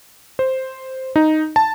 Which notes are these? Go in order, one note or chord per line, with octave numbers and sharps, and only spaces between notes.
C5
D#4
A5